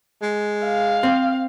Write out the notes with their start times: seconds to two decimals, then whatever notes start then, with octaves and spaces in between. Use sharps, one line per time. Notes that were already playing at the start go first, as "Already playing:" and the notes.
0.22 G#3
0.64 F5
1.03 C4